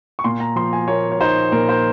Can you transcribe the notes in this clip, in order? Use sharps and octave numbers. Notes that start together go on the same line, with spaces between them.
C#6
A#2 C6
A#5
F3 C6
G#5
A#3 C#5
C#5
D#4 C5
A#2 A#4
C5